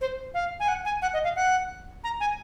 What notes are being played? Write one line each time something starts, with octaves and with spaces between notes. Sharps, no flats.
C5
F5
G#5
F#5
G#5
F#5
D#5
F5
F#5
A#5
G#5